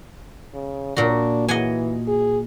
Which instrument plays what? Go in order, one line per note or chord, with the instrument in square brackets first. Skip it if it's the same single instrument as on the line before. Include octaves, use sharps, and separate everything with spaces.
[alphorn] C#3
[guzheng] A#2 F#4 [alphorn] D4
[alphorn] E3 [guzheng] D#5 F#5 G#5
[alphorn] G#4